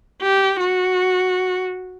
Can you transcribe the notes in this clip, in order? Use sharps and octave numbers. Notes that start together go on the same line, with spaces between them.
G4
F#4